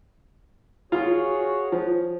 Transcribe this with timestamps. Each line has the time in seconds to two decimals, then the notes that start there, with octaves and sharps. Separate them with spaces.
0.92 F4 F#4 G#4 C#5
1.72 F3